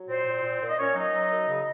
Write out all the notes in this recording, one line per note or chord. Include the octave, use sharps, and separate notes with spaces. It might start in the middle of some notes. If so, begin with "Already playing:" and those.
Already playing: F#3
A#2 C4 C5
A#2
A#2
A#2
D#5
A#2 C#4 C#5
F#3 D#4 D#5
F#3
F#2
C#3